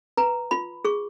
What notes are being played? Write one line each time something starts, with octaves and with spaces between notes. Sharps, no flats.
B4 A#5
F4 B5
G#4 C#6